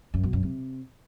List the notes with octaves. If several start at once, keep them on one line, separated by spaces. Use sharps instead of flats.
F#2
B2
F#2
C3